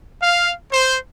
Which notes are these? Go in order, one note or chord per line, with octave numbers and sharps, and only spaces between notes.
F5
C5